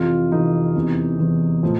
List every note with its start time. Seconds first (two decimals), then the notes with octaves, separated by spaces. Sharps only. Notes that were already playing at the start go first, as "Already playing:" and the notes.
Already playing: F2 C3 E3 F4
0.31 F2 C3 E3 D#4
0.75 E2 C3 E3
1.18 E2 C3 E3
1.63 A2 F3